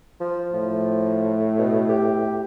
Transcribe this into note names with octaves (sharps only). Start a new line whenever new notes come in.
F3
A2 F3
B2
G4